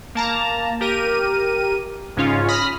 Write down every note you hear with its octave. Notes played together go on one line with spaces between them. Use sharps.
A#3 A5 A#5
G4 A#4 D#7
G#2 C#3 C#4 F4
B5 D#6 F6 A#6 B6